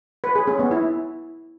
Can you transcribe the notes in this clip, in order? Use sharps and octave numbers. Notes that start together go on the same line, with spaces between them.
B4
G#4
C#4
B3
E4